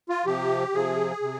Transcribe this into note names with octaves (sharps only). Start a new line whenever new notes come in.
F4
C3 F3 G4
C3 F3 G#4
C3